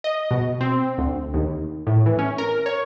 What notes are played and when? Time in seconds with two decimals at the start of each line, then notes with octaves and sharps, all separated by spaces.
0.04 D#5
0.31 B2
0.61 C4
0.98 D2
1.34 D#2
1.87 A2
2.06 E3
2.19 C#4
2.38 A#4
2.66 C#5